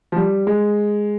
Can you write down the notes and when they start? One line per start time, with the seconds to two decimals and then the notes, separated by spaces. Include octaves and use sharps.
0.12 F3
0.16 G3
0.47 G#3